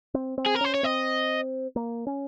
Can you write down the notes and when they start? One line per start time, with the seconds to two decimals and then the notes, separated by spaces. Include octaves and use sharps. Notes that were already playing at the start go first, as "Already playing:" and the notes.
0.14 C4
0.38 C4
0.46 G#4
0.55 A#4
0.61 C#4 C5
0.75 C#5
0.83 C4 D#5
1.76 A#3
2.07 C#4